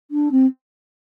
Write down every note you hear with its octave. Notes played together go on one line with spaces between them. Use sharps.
D4
C4